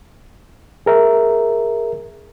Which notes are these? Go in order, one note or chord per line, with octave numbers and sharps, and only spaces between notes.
G#4 A#4 E5